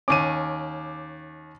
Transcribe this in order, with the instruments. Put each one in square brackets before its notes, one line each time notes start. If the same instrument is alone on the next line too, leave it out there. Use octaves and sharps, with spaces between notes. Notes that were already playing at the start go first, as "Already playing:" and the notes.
[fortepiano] D#2 C#4 [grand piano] D6 D#7